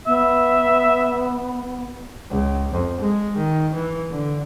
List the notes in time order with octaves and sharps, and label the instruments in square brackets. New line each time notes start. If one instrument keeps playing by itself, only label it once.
[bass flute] B3 [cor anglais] E5
[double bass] C#2
F2
G#3
D#3
E3
D3